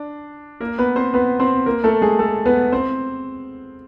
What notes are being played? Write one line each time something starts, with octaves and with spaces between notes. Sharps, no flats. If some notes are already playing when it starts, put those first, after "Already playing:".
Already playing: D4
A#3 A#4
B3 B4
C4 C5
B3 B4
C4 C5
A#3 A#4
A3 A4
G#3 G#4
A3 A4
B3 B4
C4 C5